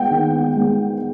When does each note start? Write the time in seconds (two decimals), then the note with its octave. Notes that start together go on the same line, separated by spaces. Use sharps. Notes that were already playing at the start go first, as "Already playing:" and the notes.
Already playing: G#3 B3 F#5 G5
0.11 D#3
0.57 G#3 B3